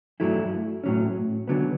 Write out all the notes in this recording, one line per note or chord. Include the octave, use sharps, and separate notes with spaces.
G2 F#3 A3 E4
A2 F#3 C#4
D3 F#3 B3